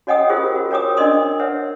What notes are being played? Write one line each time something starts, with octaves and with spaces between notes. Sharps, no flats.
F#4 C#5 D#5 F#5 G5 D#6
F4 G4 G#4 A#4 C5 D#6
F#4
A#4 C#5 G5 D6 D#6
D4 A#4 D5 D#5 C6 D#6
A#4 B4 C#5 E5 F#5